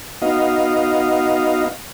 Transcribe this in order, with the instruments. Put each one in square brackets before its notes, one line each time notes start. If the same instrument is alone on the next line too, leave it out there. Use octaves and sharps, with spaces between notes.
[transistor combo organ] B3 D#4 F#4 D#5 F5